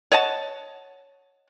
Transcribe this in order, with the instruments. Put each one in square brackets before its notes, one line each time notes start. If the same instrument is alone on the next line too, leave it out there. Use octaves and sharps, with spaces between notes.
[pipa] C#5 D#5 F#5 A5